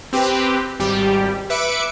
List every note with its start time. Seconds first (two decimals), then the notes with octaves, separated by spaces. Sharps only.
0.13 C4 G4 B4
0.80 G#1 G3 G4
1.50 B4 E5 D6 C#7 D7